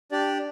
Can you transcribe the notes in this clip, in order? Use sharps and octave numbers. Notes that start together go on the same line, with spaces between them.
D4 G4 D5